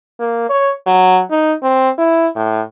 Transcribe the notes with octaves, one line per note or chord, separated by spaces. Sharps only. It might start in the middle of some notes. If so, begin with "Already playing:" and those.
A#3
C#5
F#3
D#4
C4
E4
A2